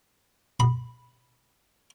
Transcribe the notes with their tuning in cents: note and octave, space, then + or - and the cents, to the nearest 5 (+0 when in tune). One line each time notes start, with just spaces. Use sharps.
B5 -5